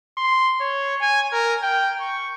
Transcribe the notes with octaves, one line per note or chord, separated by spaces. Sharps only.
C6
C#5
G#5
A#4
G5
C#6